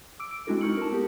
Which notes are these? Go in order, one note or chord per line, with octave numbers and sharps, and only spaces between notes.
D6 E6 D7
D7
G#3 C4 D4 E4 F#4 A4
D#4 C#6 F6 C#7 F#7
A#4 A5
B3 G4